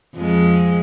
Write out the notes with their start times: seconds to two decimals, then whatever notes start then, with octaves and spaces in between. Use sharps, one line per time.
0.15 F2 G#3